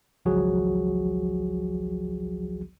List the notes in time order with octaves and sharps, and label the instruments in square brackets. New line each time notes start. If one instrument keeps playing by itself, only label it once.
[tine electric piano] G#1 C#2 F3 F#3 F#4 G#4